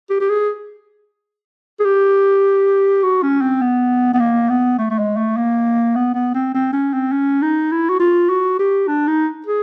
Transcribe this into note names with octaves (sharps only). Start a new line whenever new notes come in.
G4
G4
G#4
G#4
G4
F#4
C#4
C4
B3
B3
A#3
B3
A3
A3
G#3
A3
A#3
B3
B3
C4
C4
C#4
C4
C#4
D#4
E4
F#4
F4
F#4
G4
D4
D#4
G#4